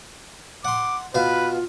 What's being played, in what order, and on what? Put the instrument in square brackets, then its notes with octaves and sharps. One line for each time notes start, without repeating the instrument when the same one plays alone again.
[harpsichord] F#5 C6 [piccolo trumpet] D6
[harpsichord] B2 F5 [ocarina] F4 [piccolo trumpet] B4